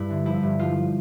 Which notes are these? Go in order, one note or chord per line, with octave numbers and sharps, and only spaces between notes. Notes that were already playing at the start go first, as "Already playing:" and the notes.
Already playing: G2 E4
D3
F3 E4
G2
F3 F4
F3